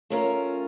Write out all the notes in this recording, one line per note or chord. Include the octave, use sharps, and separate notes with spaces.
A3 C#4 F4 A#4